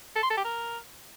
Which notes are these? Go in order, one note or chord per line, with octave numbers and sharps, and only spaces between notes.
A4
C6
A4
G4
A#4